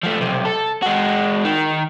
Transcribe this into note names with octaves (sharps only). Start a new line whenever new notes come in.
F3 A3
B1 C3
A4
G#3 F#4
D#3